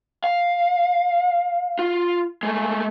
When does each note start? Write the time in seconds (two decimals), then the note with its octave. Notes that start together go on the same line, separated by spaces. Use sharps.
0.24 F5
1.79 F4
2.43 G#3 A3